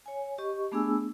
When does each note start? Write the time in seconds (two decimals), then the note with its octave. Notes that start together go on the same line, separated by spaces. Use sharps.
0.06 C#5 G#5
0.38 G4 D#5 C#6
0.72 A3 B3 D4 G#4 G#5 E6